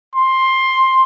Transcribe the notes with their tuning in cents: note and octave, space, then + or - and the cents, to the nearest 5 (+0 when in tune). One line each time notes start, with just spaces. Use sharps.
C6 +10